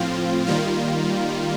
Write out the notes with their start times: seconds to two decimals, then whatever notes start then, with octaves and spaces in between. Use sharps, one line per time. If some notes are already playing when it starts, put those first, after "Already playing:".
Already playing: A2 F3 C4 F4
0.47 D#3 G3 A#3 F4